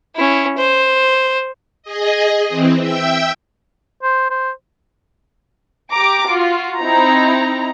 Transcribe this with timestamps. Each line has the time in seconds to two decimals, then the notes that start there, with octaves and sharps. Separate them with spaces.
0.15 C#4 E4
0.57 C5
1.83 G#4 D#5
2.49 E3 C4
2.79 E5 G5 E6
4.03 C5
4.31 C5
5.92 G4 A#5 D6 D7
6.30 F4 F#4
6.79 C4 D#4 E4 A#5